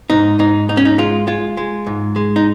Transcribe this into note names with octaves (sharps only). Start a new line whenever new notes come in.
G#2 D#4
G#2 D#4
G#2 D#4
C#4
D#4
G#3 F4
G#3 F4
G#3
G#2
G#3
D#4